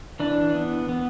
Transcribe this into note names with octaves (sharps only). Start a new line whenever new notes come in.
E3 D4
B3
B3